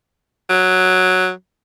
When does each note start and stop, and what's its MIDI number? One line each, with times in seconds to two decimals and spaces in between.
0.49 1.31 54